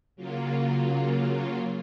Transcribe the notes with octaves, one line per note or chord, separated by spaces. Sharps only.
C#3 F#3 A#3 F4